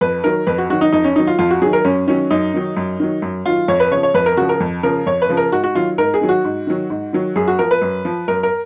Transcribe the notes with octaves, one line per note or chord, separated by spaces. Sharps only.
F2 B4
D#3 F#3 A#4
F2 B4
F#4
D#3 F#3 F#4
D#4
F2 D#4
C#4
D#3 F#3 D#4
F4
F2 F4
F#4
D#3 F#3 G#4
A#4
F#2 C#4
D#3 F#3 C#4
F#2 D#4
D#3 F#3
F#2
D#3 F#3
F#2
D#3 F#3 F4
F2 C#5
B4
C#3 F3 C#5
C#5
F2 B4
A#4
C#3 F3 F#4
A#4
F2
C#3 F3 A#4
F2 C#5
B4
C#3 F3
A#4
G#2 F#4
F#4
D#3 F#3 F4
G#2 A#4
G#4
D#3 F#3
F#4
G#2
D#3 F#3
G#2
D#3 F#3
F#2 G#4
F#4
F3 A#4
B4
F#2
F3
F#2 A#4
A#4